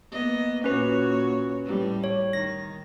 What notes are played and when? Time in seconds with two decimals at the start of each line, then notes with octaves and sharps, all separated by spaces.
0.12 A#3 B3 D#5
0.64 A#2 C#4 F#4 B4 C#5
1.65 A2 G3
2.04 C#5
2.33 D#3 A#6